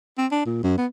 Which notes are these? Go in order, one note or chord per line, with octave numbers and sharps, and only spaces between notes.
C4
D4
A#2
F#2
B3